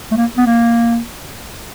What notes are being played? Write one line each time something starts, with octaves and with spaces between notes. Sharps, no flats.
A3
A#3
B3
A#3